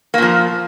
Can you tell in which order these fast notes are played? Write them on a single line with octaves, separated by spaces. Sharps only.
A#3 A#2 F3